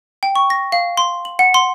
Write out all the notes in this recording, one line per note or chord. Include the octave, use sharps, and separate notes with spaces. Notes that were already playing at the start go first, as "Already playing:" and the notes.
G5
C#6
A#6
F5
C6
F#7
F#5
C6